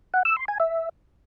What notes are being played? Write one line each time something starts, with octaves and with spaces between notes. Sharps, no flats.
F#5
E6
C6
G#5
E5